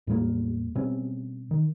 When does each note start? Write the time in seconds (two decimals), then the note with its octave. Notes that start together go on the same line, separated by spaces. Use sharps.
0.07 E2 A2 G3 A#3
0.75 B2 G3 C4 C#4
1.51 D#3